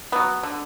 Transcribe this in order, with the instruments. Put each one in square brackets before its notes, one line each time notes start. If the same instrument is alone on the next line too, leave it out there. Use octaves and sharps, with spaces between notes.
[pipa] F#3 B3
D3